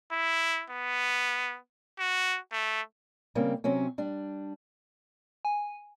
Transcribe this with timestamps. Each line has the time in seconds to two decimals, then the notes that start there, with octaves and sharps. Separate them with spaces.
0.12 E4
0.70 B3
1.99 F#4
2.52 A3
3.35 C#3 G3 A#3 C4
3.64 C3 F#3 C4 C#4
3.98 G3 D4
5.45 G#5